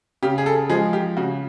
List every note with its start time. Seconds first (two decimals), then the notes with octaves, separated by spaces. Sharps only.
0.23 C#3 G4
0.38 G#4
0.46 A4
0.70 F3 G#3 G#4
0.93 G4
1.17 C#3 F#4